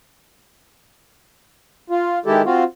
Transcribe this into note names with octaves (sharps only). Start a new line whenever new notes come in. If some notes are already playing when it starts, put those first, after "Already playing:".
F4
D#3 G#3 E4 G4 A4
C4 F4 F#4